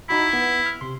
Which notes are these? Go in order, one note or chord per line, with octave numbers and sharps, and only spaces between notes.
D#4 E4 F#4 B5
B3
F6
C3 C6